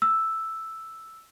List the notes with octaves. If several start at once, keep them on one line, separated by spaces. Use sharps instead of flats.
E6